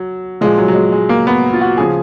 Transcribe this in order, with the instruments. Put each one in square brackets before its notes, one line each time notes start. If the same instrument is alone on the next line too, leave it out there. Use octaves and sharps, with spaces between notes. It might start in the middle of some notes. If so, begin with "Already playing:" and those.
Already playing: [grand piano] F#3
A#2 F3 G#3
F#3
F#3
G#3
G#3
A#3
B3
F4
F#4
C#3 F3 G#4